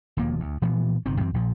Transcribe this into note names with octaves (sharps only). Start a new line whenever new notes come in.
E1 D#2 F3 A#3
D2
A#2 E3 F3 B3
G1 C3 D#3 C4
F#2 E3 C4
A#1 A#2 F3